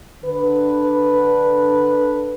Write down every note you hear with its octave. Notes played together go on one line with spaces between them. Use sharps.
D3 B4